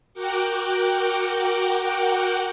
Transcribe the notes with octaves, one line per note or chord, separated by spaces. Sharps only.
F#4 A#4 F#5 G5 D6